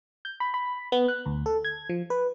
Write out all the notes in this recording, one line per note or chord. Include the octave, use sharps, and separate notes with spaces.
G6
B5
B5
B3
F#6
D2
A4
G#6
F3
B4